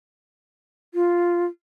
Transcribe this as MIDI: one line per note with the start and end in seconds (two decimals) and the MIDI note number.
0.94 1.45 65